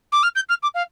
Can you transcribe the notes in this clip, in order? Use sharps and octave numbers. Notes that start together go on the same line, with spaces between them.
D6
F6
G6
F6
D6
F5